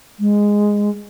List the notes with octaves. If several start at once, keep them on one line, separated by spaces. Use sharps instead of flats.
G#3